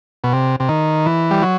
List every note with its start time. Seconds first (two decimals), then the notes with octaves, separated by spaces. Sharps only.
0.24 B2
0.33 C3
0.60 C3
0.69 D#3
1.06 E3
1.31 G3
1.42 F#3